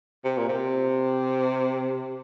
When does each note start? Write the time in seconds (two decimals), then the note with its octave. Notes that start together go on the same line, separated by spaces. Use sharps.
0.24 C3
0.37 A#2
0.49 C3